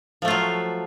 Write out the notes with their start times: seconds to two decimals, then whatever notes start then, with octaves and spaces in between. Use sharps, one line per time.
0.22 F3
0.25 A3
0.28 F4
0.31 F#3